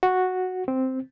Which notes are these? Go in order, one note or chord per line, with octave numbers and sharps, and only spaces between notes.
F#4
C4